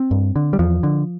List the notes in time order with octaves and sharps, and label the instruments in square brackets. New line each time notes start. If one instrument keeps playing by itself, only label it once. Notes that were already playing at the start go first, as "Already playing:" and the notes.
Already playing: [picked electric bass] C4
G2
D3
G3
E2 F3
D3